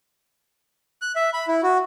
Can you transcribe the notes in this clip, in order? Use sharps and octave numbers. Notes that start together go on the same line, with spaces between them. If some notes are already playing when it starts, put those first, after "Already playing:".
F#6
E5
B5
E4
F#4